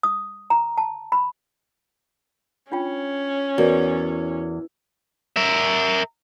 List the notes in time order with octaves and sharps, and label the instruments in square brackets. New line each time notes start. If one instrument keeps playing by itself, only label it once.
[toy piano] D#6
A#5
A5
B5
[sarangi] C#4 [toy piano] D4 F4 G5
[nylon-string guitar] E2 [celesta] F#4 A#4 [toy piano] D5
[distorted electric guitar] A#4 E5